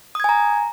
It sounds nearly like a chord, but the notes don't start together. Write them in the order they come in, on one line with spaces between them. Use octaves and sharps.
D#6 G#6 G#5 A#5